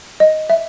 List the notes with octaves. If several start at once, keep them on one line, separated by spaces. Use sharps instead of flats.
D#5
E5